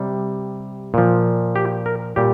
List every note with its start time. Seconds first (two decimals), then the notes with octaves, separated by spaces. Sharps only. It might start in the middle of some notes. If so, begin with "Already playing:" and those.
Already playing: C3 G3
0.94 A#2 F3
1.56 G4
1.86 A#4
2.16 A#2 G3 G4